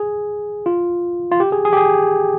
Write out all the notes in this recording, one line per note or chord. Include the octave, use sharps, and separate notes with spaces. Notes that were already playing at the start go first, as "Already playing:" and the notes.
Already playing: G#4
F4
F4
G4
G#4
G#4
G4
G#4